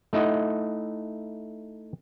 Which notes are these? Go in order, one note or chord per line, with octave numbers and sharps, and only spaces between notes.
A3 D#4 E4 D#5 F#5